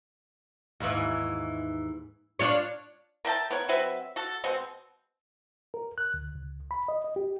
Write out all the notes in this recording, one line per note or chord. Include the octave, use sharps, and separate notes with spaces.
D#2 G#2 E3
D4 F4 C#5
A#4 E5 G5 A5
B3 A#4 C#5
F#3 C4 B4 E5
F#4 A4
B2 G#3 C4
A#4
F#6
D2
C#2
B5
D#5
D#5
G4